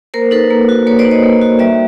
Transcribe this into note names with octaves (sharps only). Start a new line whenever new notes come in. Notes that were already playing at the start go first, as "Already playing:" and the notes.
A#3 A#4 C5
D#4 A4 B4
A#3
F#4
A#3 B4 C#5
C5 D5
D#4
C#5 D#5
A#3
F#4
G3 D5 E5